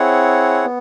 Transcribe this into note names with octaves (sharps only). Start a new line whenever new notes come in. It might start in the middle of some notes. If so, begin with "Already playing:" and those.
Already playing: C4 E4 G#4 C#5 F#5
B3